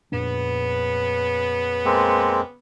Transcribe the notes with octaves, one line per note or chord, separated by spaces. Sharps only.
F2 A#2 C#3 B3 D4
G#3 A#3 C4